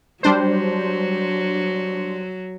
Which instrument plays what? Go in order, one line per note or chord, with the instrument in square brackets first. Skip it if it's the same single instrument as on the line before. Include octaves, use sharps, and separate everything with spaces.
[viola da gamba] F#3 [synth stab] G3 D4 C5